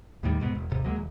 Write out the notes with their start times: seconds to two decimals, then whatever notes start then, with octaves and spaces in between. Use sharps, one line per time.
0.23 D#2 A2 D#3 G3
0.40 C2 G#2 B2 B3
0.55 E1
0.70 D#1 G#1 C3
0.84 D2 F#3 G#3 A#3
0.96 D#1